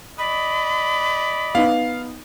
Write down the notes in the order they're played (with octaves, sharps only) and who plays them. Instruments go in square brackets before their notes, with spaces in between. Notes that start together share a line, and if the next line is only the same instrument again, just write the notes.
[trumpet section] D5 D#5 [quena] B5
[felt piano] B3 D#4 [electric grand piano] F5